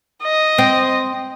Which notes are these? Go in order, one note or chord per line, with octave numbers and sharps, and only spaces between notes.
D#5
C4